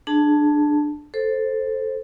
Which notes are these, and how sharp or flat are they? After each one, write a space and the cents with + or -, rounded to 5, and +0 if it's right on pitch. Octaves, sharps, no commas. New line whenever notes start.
D4 +15 G#4 +15 A5 +0
A4 +0 C5 +5